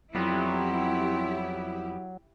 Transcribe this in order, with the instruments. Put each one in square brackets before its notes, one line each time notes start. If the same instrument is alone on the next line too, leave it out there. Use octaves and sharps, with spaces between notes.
[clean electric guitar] F2 G3 B3 [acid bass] F#3 [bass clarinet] C4 [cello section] E4 G4